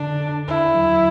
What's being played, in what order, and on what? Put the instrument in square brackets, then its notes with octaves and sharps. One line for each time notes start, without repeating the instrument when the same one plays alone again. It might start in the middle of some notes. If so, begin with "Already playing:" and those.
Already playing: [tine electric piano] D3 [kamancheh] D4
[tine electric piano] D3
[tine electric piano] D#2 [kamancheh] E4
[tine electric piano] F#3